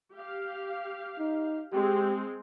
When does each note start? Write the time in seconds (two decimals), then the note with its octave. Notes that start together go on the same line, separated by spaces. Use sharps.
0.14 G4 F5
1.19 D#4
1.73 G#3 C4 G4